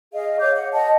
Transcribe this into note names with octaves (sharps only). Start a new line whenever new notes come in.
G#4 D#5 F5
C#5 F5 D6 G6
F#5
D#5 F#5 A5